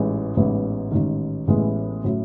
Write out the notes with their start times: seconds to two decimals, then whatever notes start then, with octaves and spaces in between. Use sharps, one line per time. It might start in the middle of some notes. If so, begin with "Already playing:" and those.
Already playing: A1 G#2 E3 G#3
0.37 A1 G#2 E3 B3 E4
0.92 A1 G#2 D#3
1.47 A1 A2 E3 G#3 B3
2.04 A2 F#3 C#4 E4